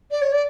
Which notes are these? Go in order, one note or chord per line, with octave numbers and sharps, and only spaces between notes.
D5
C#5
D5